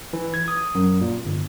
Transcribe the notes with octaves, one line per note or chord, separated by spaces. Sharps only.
E3
G#6
D#6
F#2
A#2
G1